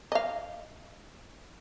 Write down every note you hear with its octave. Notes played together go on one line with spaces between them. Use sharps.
D#5 F5